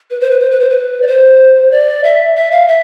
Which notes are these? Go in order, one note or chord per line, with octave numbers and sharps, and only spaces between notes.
B4
C5
B4
C5
B4
C5
B4
D5
C5
D5
E5
E5
F5
E5